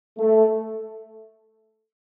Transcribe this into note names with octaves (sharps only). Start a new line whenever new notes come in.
A3